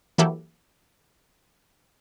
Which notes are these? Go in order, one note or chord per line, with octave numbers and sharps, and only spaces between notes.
E3 F#3 A#3 E4 G4 A4